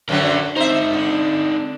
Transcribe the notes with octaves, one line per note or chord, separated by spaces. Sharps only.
F#2 D3 F#3 A#4 C5
C4 D#4 C5 E5
D3